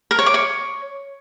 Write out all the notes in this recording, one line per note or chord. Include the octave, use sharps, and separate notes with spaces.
A#4
C#5
D6
C#5